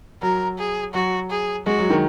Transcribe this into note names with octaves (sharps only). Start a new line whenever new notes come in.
F#3 A#4
G#4
F#3 F#4
G#4
G#3 F#4
F#3
D#3